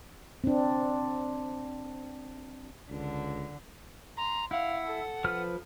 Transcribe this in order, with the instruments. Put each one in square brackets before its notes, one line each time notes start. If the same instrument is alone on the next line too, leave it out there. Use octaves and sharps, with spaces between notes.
[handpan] C4 D4
[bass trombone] C#2 [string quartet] D3
[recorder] A#5 [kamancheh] C6
[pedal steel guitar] E4 [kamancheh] F5 [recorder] F#5
[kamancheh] A4
[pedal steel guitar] F3 B4 F6